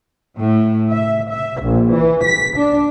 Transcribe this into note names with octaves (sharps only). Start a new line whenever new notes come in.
A2
E5
E5
A#1
E3
B6
D4